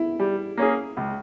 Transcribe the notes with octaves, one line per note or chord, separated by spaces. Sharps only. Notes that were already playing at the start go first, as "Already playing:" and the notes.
Already playing: E4
G3
A#3 C#4 G#4
C#2